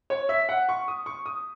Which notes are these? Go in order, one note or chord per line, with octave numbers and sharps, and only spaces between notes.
C#5
E5
F#5
C#6
D#6
C#6
D#6